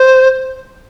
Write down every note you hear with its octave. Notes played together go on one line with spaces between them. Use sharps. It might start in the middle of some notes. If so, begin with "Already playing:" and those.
Already playing: C5